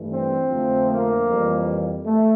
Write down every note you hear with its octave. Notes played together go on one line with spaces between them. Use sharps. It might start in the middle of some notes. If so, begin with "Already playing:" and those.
Already playing: G2 E3 A3
C4
F2 D3 F3 A3
A#3
F2 E3 G3
A3